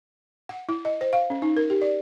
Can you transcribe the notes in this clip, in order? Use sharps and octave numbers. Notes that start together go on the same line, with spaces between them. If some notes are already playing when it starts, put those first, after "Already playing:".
F#5
E4
D#5
C5
F5
C#4
D#4
A#4
G4
D5